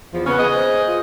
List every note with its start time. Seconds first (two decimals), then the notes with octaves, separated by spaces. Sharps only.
0.12 E2 F3
0.26 C#3 B3 C#4
0.39 G#4 D#5
0.54 C5
0.87 F4